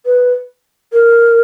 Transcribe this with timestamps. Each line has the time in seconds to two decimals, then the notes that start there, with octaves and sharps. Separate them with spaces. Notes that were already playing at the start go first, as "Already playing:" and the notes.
0.06 B4
0.92 A#4